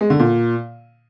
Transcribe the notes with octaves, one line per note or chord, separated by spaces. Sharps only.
G#3
D3
A#2